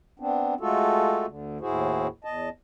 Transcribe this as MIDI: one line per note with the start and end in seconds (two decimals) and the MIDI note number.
0.20 0.54 59
0.20 0.54 60
0.20 0.54 62
0.60 1.26 56
0.60 1.26 57
0.60 1.26 65
0.60 1.26 66
0.60 1.26 69
1.27 1.58 38
1.27 1.58 50
1.61 2.07 39
1.61 2.07 45
1.61 2.07 64
1.61 2.07 66
1.61 2.07 68
1.61 2.07 72
2.24 2.49 40
2.24 2.49 75
2.24 2.49 81